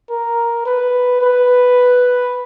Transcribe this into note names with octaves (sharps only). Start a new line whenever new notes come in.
A#4
B4
B4